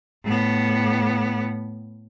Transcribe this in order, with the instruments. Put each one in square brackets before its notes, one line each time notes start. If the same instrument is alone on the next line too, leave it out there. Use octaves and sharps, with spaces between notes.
[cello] A2 B3